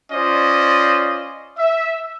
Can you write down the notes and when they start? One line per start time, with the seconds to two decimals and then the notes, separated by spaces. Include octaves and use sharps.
0.12 C#4 F4 C5 D5 D#5
1.58 E5